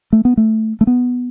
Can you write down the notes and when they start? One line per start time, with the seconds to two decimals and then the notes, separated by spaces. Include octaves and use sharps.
0.13 A3
0.25 B3
0.37 A3
0.81 A3
0.87 B3